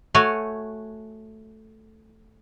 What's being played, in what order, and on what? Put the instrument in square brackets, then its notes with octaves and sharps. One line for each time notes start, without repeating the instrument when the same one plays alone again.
[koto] A3 F#4 C#5 G#5